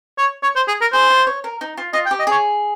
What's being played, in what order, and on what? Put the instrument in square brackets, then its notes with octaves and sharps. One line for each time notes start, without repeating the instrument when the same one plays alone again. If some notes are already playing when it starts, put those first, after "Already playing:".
[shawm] C#5
C#5
C5
G#4
A#4
[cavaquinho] G#4 [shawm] C5
[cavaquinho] F4
C#5
A#4
D#4
F4
[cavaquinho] F4 [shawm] D#5
[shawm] G5
[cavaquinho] G4
[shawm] D#5
[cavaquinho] G#4 [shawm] C#5